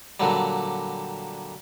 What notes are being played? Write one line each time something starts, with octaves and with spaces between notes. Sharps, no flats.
A#2 D3 F#3 G3